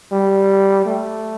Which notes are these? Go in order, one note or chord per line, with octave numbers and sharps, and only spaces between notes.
G3
A3